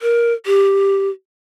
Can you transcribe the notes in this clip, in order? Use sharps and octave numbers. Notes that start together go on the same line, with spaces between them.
A#4
G4